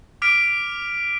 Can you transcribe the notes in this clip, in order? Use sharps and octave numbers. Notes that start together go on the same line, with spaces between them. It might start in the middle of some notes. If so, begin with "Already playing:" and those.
D6 F6 B6 D7 F7